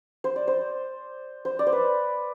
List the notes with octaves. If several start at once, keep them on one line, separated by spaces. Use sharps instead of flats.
C5
D5
C5
C5
D5
C5
B4